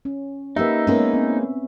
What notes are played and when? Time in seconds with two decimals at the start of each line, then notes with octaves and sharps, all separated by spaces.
0.05 C#4
0.56 A#3 D#4 G4 B4 E5
0.87 G#3 A#3 B3 C#4 B4
1.14 C4